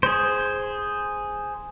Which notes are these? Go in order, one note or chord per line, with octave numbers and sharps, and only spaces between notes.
G#4 C5